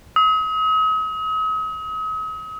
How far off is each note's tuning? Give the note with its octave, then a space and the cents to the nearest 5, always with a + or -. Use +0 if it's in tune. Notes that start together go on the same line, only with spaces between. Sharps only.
D#6 +40